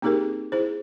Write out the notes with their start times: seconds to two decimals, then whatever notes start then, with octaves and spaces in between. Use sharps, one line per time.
0.02 A#3 C4 D#4 G4 G#4 A#4
0.52 E4 G#4 C5